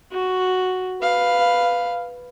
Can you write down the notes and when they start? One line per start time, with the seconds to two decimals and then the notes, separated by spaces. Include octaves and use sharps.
0.12 F#4
1.01 B4 F5